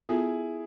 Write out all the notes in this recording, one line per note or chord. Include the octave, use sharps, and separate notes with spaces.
B3 E4 F4 G#4 A4